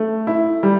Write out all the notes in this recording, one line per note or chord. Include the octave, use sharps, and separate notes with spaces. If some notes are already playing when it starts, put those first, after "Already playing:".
Already playing: A3
E4
G3